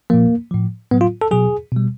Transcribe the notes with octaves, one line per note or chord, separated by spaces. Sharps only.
A#2 F3 A#3
A2 F3
A2 F#3 B3
F4
A4
B2 F#3 G#4
B2 G3